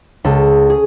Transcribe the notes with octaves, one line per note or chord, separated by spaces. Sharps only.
C#2 A4
G#4